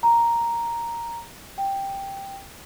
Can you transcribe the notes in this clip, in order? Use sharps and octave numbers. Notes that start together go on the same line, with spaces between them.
A#5
G5